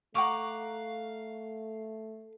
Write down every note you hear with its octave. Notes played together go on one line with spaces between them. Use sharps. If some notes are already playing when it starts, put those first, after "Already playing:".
A3 F5 F#5 A#5 C#6 D6